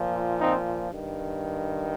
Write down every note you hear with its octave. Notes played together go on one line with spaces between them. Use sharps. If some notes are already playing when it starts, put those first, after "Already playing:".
Already playing: A#2 F3
C4 D#4
G2 D#3